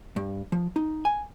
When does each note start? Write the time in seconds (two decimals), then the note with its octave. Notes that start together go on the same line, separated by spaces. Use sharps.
0.16 G2
0.52 F3
0.76 D#4
1.05 G#5